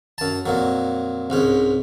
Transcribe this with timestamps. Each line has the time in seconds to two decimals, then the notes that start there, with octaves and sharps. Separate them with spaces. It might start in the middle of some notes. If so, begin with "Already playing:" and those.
0.18 F#2 A5
0.46 F2 A#2 F#3
1.30 C2 G#2 C#4